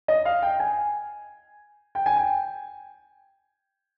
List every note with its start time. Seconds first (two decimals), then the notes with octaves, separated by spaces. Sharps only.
0.08 D#5
0.25 F5
0.42 G5
0.60 G#5
1.95 G5
2.06 G#5
2.16 G5